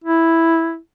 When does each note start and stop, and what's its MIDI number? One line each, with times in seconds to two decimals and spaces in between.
0.04 0.77 64